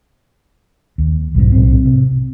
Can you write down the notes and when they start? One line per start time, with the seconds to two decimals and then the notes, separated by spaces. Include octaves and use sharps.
0.98 D#2
1.35 B1 F2 G#2
1.52 B1 A2 C4
1.85 C3